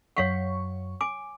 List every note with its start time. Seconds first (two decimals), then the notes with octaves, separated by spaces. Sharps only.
0.17 F#2 F#3 C#5 F5 F#5 C#6
1.01 G#5 D6